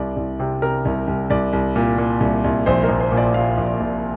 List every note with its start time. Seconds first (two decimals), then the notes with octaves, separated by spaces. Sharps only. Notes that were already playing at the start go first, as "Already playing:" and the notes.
Already playing: C2 D5
0.16 C2
0.40 C3
0.62 C3 A#4
0.85 C2
1.07 C2
1.30 C2 D5
1.53 C2
1.76 A#2
1.98 A#2
2.20 C2
2.44 C2
2.66 A#1 C5
2.83 A#4
2.89 A#1
3.00 C5
3.12 A#2
3.17 D5
3.34 A#2 F5
3.57 A#1
3.80 A#1